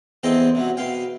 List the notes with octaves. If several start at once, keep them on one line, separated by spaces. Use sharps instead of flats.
E2 C4 A4 D#5 G5 A#5
C3 F#3
B2 F5 G5